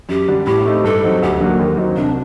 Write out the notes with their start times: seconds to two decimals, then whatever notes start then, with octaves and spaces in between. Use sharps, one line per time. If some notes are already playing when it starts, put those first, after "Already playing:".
0.09 F#2 G4
0.28 D3 G3 D4
0.47 A2 G4
0.65 A3 C4 D#4
0.84 G2 A4
1.03 F#3 C4 D#4
1.22 D2 G4
1.40 D3 F#3 A#3
1.59 D#2
1.78 D#3 F#3 C4 D#4
1.96 C2 D4